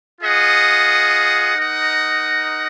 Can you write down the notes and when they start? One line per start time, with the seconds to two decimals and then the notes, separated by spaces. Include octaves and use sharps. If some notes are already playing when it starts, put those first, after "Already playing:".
0.21 F4 G#4 D#5 F#5
1.56 D#4 A#4 D#5 F#5